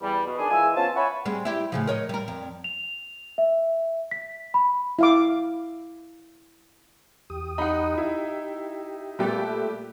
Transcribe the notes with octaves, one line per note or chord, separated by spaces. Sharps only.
E2 G3
B2
D#3 D4 G#4
E3 G#3 F4 E5 G#5
B3 C#4 F4 C5 A5
C#5 E5 F#5 G#5 B5 C#6
G3 G#3 C4
E4 G4
A2 C#3 F3
A#4 C#5 D#5
G3 A#4
F2
F7
E5
B6
B5
E4 F5 D6
E2 G4 D#6
D#4 F#5 B5
E4 G4
A#2 G3 A3 B3 G4 E5